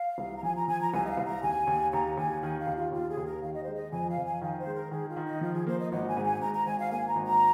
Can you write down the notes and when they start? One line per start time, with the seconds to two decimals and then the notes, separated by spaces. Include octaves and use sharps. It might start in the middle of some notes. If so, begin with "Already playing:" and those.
Already playing: F5
0.18 C2
0.37 A#5
0.43 F3 G#5
0.56 A#5
0.68 F3 G#5
0.80 A#5
0.93 C2 G#5
1.05 D#5
1.10 F5
1.17 C2
1.26 A#5
1.43 D#2 G#5
1.67 D#2
1.93 D#2 A#5
2.17 D#2 G#5
2.42 D#3 G#5
2.60 F5
2.67 D#2
2.76 F4
2.92 D#2 F4
3.09 G#4
3.17 D#2
3.26 A#4
3.42 D#3 F5
3.53 D#5
3.63 G#3 C5
3.74 D#5
3.92 F2 G#5
4.09 F5
4.18 F2
4.25 G#5
4.41 D#3 F5
4.59 C5
4.66 G#3
4.75 A#4
4.91 D#3 G#4
5.09 F4
5.16 D#3
5.26 D#4
5.41 F3 F4
5.54 G#4
5.67 A#3 C5
5.79 D#5
5.92 G#1 D#5
6.08 G#5
6.17 G#2
6.25 G#5
6.42 G#2 A#5
6.54 A#5
6.66 G#1 G#5
6.79 F5
6.91 A#3 G#5
7.08 A#5
7.16 G#1
7.25 A#5